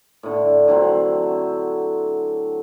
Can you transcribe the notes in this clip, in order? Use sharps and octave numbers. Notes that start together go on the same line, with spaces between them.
A2 D3
D3 F#3 C4